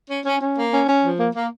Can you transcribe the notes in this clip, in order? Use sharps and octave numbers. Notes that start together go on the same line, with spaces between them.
C#4
C#4
C#4
A#3
C#4
C#4
F3
A#3
A#3